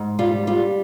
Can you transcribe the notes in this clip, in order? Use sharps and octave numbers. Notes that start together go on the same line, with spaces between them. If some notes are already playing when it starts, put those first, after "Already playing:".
Already playing: G#2
G3 F4
G3 F4